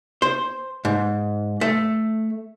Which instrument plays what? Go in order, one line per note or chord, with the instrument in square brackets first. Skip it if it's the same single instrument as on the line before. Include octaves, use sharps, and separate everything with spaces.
[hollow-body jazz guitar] C5
G#2
A3